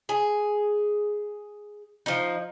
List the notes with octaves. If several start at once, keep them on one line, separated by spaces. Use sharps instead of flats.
G#4
F3 D#4